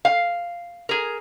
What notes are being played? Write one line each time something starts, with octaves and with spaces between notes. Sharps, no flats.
F5
G#4 A#4